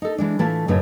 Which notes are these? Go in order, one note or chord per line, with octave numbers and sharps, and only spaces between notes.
D#4 A4
E3 G#3 D4
A2 E3 A3 F4 A5
F#2 A2 C#3 F#3 D#4 B4